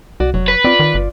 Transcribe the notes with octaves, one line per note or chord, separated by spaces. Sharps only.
C2 F#4 D5
F1 F#3
B4
C4 F4 D5
D#3
G1